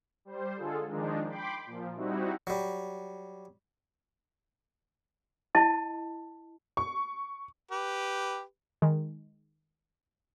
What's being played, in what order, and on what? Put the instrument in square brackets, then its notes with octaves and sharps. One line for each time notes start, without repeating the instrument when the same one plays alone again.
[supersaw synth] G3 C5
D3 G#3 F4 G#4 A4
D#3 F3 G#3 D4 D#4
G5 B5 C6 D6
A#2 F3
G3 C4 D#4 E4 F#4
[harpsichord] F#3 G3
[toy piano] E4 D#5 A5
[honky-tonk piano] C#6
[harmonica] G4 B4
[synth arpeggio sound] D#3 G#3